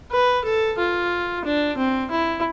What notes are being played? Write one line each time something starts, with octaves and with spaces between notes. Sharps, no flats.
B4
A4
F4
D4
C4
E4